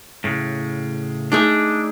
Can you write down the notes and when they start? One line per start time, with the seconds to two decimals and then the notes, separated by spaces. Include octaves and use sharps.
0.24 A2 C#3
1.32 A3 D4 D#4 G#4 E5